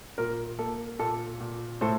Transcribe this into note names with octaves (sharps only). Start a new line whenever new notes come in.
A#2 A#4
A#3 A4
A#2 A4
A#2
A2 A4 C5